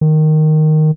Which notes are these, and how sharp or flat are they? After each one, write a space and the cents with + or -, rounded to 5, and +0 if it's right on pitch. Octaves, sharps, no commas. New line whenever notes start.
D#3 -5